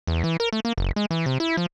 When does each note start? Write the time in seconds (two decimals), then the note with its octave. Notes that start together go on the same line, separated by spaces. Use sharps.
0.07 E2
0.24 E3
0.40 A#4
0.53 A3
0.65 A#3
0.78 F#1
0.96 G#3
1.11 E3
1.26 C3
1.40 E4
1.57 F3